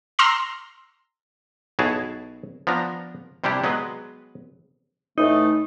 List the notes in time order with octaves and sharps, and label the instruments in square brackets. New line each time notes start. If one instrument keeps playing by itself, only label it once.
[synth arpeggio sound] A#5 C6 E6 F6 A#6
[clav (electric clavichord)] B1 E4 F#4 G#4 C#5 A5
F3 B3 D4 A#5
C3 G3 D4 E4 G4
F#3 G#3 B3 B4
[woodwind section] A2 E3 A3 [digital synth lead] D#4